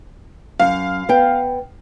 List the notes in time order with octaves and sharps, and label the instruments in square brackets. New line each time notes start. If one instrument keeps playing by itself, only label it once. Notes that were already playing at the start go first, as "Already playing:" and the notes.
[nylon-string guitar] F#2 [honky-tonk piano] F5
[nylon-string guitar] B3 G5